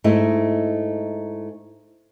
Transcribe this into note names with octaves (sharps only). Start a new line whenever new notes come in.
G#2 A3 E4 D#5